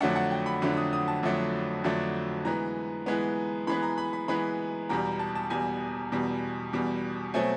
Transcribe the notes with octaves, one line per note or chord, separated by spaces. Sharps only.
F2 D3 F#3 A3 D4 F#5
F#5
G5
B5
F2 D3 F#3 A3 D4
D#6
D#6
A5
F2 D3 F#3 A3 D4
F2 D3 F#3 A3 D4
E3 G#3 B3 A#5
E3 G#3 B3
E3 G#3 B3 B5
A#5
B5
B5
E3 G#3 B3 B5
E2 B2 G3 A#5
A#5
A5
A5
E2 B2 G3 G#5
E2 B2 G3
E2 B2 G3
B2 F#3 A3 C4 G#5